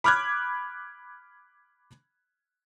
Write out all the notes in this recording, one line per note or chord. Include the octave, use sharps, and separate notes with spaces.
B5 D6 F6 F#6 G#6